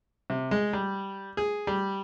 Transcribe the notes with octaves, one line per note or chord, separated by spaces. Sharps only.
C3
G#3
G3
G#4
G3